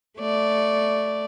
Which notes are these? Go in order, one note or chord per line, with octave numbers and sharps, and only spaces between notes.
A3 D5